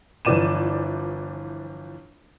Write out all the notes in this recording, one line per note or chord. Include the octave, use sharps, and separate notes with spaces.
G1 E3 F3 D5 D#7 E7